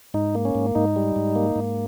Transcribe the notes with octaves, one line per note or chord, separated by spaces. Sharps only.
G#2 D#4
A#3
C#4
G#2
G#2 D#4
G3
G#2
A#3
G#2